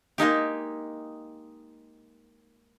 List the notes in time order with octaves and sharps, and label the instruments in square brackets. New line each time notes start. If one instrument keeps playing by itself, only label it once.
[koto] G#3 A#3 D#4 G4